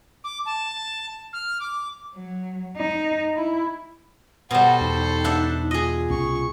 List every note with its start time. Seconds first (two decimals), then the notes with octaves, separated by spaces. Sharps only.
0.24 D6
0.46 A5
1.33 F6
1.60 D6
2.15 F#3
2.77 D#4
3.36 E4
4.51 B2 G3 A4 C5 F#5
4.81 E2 D#4
5.24 D4 E5 F#5
5.71 F4 G#4 D#5
6.10 C2 C#4 C#6